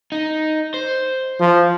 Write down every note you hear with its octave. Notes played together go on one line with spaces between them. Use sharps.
D#4
C5
F3